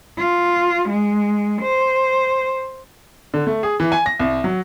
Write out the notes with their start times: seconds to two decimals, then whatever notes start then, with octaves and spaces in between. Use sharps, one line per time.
0.18 F4
0.89 G#3
1.62 C5
3.34 D3
3.47 A3
3.63 G#4
3.80 E3
3.92 G#5
4.06 A#6
4.19 C2
4.44 F#3